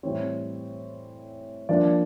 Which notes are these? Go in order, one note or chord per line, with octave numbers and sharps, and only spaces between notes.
A2 E3 G3 C4 C#5
F3 A#3 D4 D5